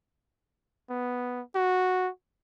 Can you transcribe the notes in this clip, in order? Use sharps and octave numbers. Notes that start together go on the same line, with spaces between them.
B3
F#4